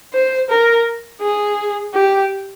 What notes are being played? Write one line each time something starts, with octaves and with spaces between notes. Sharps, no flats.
C5
A#4
G#4
G4